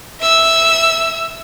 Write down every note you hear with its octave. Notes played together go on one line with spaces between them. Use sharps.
E5 E6